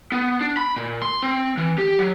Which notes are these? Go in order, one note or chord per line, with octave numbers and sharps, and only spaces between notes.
B3
D4
B5
A#2
C6
C4
E3
G4
F#3